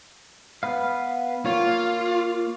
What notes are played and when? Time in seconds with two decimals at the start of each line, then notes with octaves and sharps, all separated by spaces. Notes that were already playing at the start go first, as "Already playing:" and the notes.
0.63 B3 B4 F5
1.46 A#3 F4 C#5